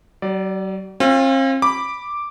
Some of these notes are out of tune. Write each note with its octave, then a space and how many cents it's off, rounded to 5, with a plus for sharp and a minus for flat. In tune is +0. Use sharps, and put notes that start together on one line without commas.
F#3 +45 D5 +0
C4 +45 F4 +0
B5 -5 D6 +0